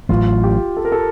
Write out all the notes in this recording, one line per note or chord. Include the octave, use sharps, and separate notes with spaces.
A1 A2 F#3 F4
G4
A4
A#4
A4